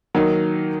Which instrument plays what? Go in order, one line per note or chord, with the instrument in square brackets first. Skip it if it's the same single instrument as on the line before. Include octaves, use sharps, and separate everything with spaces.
[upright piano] D#3 F#3 A#3 D#4